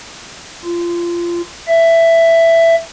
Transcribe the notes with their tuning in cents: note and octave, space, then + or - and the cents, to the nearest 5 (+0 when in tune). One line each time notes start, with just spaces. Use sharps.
F4 -20
E5 +10